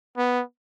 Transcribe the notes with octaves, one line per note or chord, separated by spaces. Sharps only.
B3